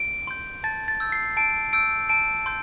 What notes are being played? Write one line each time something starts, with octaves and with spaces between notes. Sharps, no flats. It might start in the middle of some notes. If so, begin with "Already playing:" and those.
Already playing: D7
C6 G6
A5 A6
A6
E6 G6
C7
A5 D7
E6 G6 D7
A5 D7
C6 G6